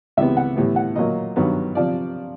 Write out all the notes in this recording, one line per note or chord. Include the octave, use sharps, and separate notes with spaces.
C#2 C3 E3 G3 B3 E5
F#5
A2 E3 G3 B3
F#5
A#2 F#3 A#3 D#5
G2 D#3 F#3 B3
C3 F3 D5